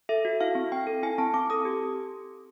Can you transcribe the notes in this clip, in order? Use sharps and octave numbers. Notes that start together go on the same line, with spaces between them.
A4 E5
F#4
E4 F5
C4
C4 G5
A4
E4 G#5
C4 A5
C4 D6
A4 D#6
G4